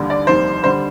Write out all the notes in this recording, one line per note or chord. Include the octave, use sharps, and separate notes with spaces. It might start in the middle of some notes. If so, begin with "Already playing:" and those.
Already playing: D#2 D3 G3
D5
F1 D#2 D#3 G3 C5
D3 G3 C5